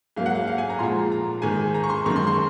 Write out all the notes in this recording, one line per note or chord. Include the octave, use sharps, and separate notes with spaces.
G#2 F#3 A#3 F5
F#5
F5
F5
G#5
A#5
A#2 F3 G#3 C6
A#5
G#2 D#3 G#3 G#5
A#5
C#6
C6
F#2 D#3 G#3 C#6
C6
C6